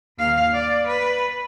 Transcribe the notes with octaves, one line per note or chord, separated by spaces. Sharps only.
D#2 F5
D5
B4